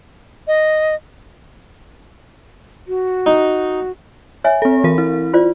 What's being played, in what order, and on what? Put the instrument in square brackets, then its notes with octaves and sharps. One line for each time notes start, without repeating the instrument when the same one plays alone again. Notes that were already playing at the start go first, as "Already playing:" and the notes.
[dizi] D#5
[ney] F#4
[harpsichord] D#4
[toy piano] C#5 E5 G#5
[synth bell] C4 A4
E3 A#4
E4
[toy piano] F4 C5 D5